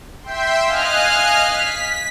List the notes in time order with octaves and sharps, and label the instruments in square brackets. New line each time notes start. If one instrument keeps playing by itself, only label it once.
[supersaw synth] E5 G5 C6
[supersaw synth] D#5 G#5 F#6 [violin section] F5 F6
[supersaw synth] B6